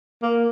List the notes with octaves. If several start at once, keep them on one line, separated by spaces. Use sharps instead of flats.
A#3